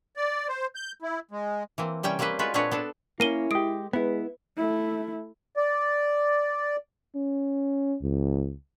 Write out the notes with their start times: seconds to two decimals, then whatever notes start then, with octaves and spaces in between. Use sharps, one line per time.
0.17 D5
0.48 C5
0.75 G6
1.02 E4
1.31 G#3
1.78 E3 A#3 C4
2.03 C3 G3 C#4 G5
2.19 G3 A#3 C4 C#4 B4 C5
2.39 G#3 F4 F#4 B4
2.54 A#2 C4 D4 F#4 B4 C#5
2.71 B3 D4 A4
3.20 A#3 C4 C#4 E4 A#4 D#7 G7
3.51 G#3 G4 D#6 D7
3.93 G#3 B3 E4 B4
4.57 A3 E4
5.57 D5
7.16 C#4
8.02 C#2